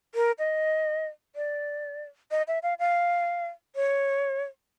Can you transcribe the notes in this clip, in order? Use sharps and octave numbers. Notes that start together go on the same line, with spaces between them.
A#4
D#5
D5
D#5
E5
F5
F5
C#5